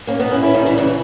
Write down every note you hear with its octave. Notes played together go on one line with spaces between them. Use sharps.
A#3 C#4
B3 D#4
C#4 E4
C#4 E4
D#3 G3
C#3 E3
C#3 E3